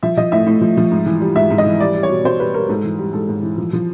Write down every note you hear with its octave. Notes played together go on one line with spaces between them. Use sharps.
F3 E5
F3 D#5
A2 E5
A2
F3
F3
G#2
E3
G3
G#2 E5
G#2
D#5
E3
G3 D5
G3
C#5
B2
B2 C5
G3 B4
G3 A#4
G#2 A4
E3
G3
G#2 A4
G#2
E3
F3
F3